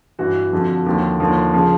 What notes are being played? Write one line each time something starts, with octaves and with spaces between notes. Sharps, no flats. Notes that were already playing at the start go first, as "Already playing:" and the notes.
G2 E3 F#4
F2 D3 F3
D#2 D3 F3 G4
D#2 D3 F3
C#3 F3